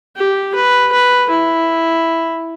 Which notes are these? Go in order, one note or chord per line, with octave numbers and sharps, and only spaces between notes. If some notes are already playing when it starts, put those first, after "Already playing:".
G4
B4
B4
E4